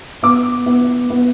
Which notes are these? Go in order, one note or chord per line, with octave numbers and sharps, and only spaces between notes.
B3 D6
B3
B3